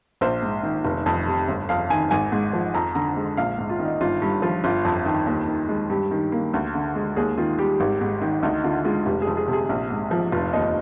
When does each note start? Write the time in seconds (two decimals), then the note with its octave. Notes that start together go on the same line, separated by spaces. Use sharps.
0.21 A#1 C5
0.42 G#2
0.63 D#3
0.85 F1
1.06 F2
1.27 C3
1.48 G1
1.69 F2 F5
1.90 D#3 G#5
2.11 G#1 G#5
2.32 G#2
2.53 F3
2.74 F2 A#5
2.95 D3 A#5
3.16 G#3
3.37 A#1 F5
3.58 G#2
3.69 F4
3.79 D#3
3.85 D#4
4.01 G1 F4
4.22 G2
4.42 F3 F4
4.64 G1 F4
4.85 F2
5.06 D#3
5.26 D#2
5.48 D#3
5.69 G#3
5.90 G2 G4
6.11 D#3
6.32 A#3
6.54 D2
6.75 D3
6.95 G#3
7.16 D#2 G#4
7.38 D#3 F4
7.58 G3 G4
7.80 G#1
8.01 G#2
8.21 D#3
8.43 D2 D#4
8.64 D3 F4
8.85 G#3 F4
9.06 F1 G4
9.22 G#4
9.27 F2
9.37 G#4
9.48 C3
9.53 G#4
9.69 A#1
9.90 G#2
10.11 F3
10.32 F1 F4
10.53 D#2 D#4